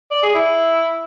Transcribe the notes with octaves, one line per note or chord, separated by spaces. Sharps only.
D5
G#4
E4